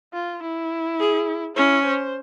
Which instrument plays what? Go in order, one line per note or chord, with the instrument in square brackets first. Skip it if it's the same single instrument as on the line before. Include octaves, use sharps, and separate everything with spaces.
[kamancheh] F4
E4
[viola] G#4
[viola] C#4 [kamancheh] E4
[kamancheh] C5